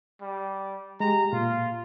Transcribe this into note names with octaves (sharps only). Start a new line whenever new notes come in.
G3
G#3 G4 A#5
A#2 F4